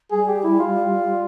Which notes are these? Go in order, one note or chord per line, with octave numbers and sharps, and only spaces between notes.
G3 G#4
G4
E4
F4